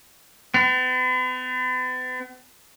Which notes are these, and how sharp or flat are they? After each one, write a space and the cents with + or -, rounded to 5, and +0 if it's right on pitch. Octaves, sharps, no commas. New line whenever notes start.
B3 +45